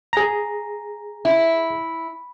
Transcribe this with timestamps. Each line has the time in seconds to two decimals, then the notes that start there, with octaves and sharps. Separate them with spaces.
0.13 G#4 A#5
1.25 E4